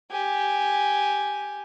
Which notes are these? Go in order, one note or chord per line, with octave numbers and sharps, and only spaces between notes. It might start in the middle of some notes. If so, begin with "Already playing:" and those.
G4 G#5